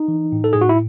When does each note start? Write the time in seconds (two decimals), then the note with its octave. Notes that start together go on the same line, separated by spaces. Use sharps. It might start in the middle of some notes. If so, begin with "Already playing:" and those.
Already playing: D#4
0.08 E3
0.32 A2
0.44 A4
0.53 A2 G#4
0.61 F#4
0.69 E4